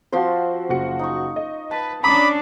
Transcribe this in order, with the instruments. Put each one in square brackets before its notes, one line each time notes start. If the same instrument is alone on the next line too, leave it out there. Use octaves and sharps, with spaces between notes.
[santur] F3 C6 [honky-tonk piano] C4 F#4
[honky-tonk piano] F#1 F#4 C#7
[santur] D#4 C#6
[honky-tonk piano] D#5
[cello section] B4 [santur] A5
[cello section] C#4 D4 [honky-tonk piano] A#5 D6 D#6 [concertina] B5